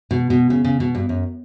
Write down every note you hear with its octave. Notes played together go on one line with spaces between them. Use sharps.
B2
B2
C#3
C#3
B2
G2
F#2